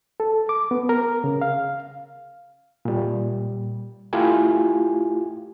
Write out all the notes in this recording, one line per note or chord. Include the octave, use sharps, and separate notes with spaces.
A4
D6
B3
A#4
C#3
F5
A#2 G3
A3 E4 F4 G4 G#5